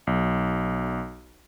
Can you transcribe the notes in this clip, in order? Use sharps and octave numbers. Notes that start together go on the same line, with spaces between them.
B1